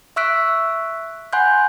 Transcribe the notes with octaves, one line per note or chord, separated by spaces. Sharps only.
E5 C#6 E6 F#6 B6 D7
F#5 G#5 B5 C6 F#6 G6